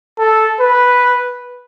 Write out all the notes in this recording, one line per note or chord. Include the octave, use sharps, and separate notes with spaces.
A4
B4